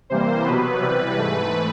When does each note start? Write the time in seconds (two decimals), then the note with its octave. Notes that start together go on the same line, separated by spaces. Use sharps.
0.10 C3 E3 G3 A#3 C5
0.45 B2 F#3 B3 B4
0.80 C3 E3 G3
1.17 G#2 E3 A3